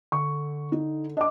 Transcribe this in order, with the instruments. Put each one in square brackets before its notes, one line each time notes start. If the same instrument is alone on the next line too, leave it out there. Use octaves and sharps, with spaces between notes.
[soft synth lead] D3 [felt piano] C#6
[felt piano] D#4
[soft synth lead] D4 [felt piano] D#5 D6